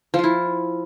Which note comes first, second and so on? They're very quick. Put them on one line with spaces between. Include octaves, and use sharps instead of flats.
F3 F4 E4